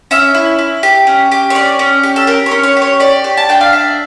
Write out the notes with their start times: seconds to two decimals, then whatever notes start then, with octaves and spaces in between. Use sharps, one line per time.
0.11 C#4 E5
0.35 E4
0.59 E4
0.83 G4
1.07 C#4
1.32 G4
1.50 C#5
1.55 C#4 D5
1.79 C#4
2.03 G4
2.16 A4
2.27 G4 A#4
2.46 C#5
2.51 C#4
2.63 C#5
2.77 G4
2.82 C#5
3.00 G4 D5
3.24 G4
3.37 A5
3.49 D4 G5
3.61 F5
3.73 D4 E5